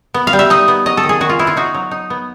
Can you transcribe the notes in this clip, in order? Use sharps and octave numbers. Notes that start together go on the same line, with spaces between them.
B3
F5
G3
E5
D#4 D#5
B3
F#3 D#5
A4
D#3
G#4
D#3 F#4
F4
B3 E4
F4
D#4 F#4
F#3
D#4
B3